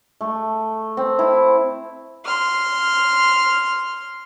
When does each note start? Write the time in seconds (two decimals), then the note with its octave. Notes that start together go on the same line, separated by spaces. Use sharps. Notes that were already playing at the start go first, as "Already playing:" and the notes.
0.21 A3
0.97 C4
1.19 E4
2.26 C6 F6